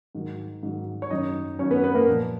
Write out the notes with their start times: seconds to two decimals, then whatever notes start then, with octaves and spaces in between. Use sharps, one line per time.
0.15 G#2 D#3 F#3
0.63 G#2 D#3 F#3
1.02 C#5
1.10 F#2 D#3 F#3 D#4 D#5
1.59 F#2 D#3 F#3 C#4 C#5
1.71 B3 B4
1.83 B3 B4
1.95 A#3 A#4
2.07 A#2 F3